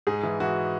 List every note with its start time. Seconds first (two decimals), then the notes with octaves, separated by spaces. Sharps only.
0.07 G#2 G#4
0.23 E3
0.40 E3 F#4